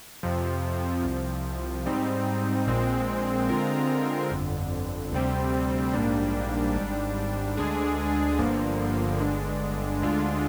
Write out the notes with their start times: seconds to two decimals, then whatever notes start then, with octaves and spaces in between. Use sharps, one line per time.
0.23 F2 C3 F3
1.04 C2 C3 F3
1.86 G#2 G3 C4 D#4
2.67 A#1 A#2 G#3 C4
3.49 D3 G#3 C4 F4 A#4
4.30 G1 F2 D3
5.12 D2 C3 G3 C4
5.94 A#1 G#2 G3 A#3 D4
6.75 G#1 G#2 G3 D4
7.57 D2 D3 G#3 D4 G#4
8.39 G1 G2 D3 F3 A#3
9.19 G1 G2 D3 G#3 D4
10.01 D2 D3 G#3 D4 F4